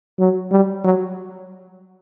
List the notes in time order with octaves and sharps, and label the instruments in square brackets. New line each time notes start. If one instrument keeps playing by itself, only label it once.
[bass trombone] F#3
G3
F#3